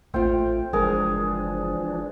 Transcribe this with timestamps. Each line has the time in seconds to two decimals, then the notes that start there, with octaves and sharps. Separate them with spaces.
0.14 A1 A3 C4 F4 G5
0.73 F#1 E3 F3 G#3 D4 G#4 A#4